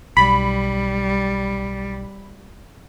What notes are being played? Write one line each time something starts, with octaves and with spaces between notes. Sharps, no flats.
B1 G3 B5